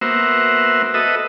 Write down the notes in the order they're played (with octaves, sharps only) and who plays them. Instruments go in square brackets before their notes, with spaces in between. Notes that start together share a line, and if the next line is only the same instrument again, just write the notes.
[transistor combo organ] A#3 B3 F#4 C5 E5
F#4 A4 B4 D#5 E5